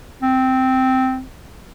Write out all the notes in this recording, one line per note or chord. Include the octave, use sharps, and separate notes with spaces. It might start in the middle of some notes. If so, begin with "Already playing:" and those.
C4